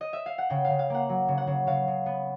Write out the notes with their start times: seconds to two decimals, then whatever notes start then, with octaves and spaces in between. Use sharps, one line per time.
0.01 D#5
0.13 E5
0.26 F5
0.38 F#5
0.50 C#3 G5
0.65 F5
0.70 C#3
0.79 F5
0.90 A#3 F#5
1.09 F#3
1.28 C#3
1.38 F#5
1.47 C#3
1.67 C#3 F5
1.88 C#3
2.06 B3